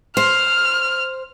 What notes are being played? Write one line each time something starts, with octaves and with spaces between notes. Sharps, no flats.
C5 F6